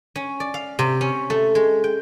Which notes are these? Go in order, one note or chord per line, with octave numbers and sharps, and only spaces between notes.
C#4
D5
F5
C3
C#4
A3
G#3
G5